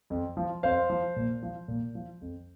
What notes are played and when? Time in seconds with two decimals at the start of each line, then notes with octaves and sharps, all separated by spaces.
0.10 F2
0.37 F3
0.63 F2 C5 F5
0.90 F3
1.16 A#2
1.43 F3
1.68 A#2
1.95 F3
2.21 F2